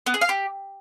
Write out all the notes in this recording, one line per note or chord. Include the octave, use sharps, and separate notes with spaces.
B3
G#4
F5
G4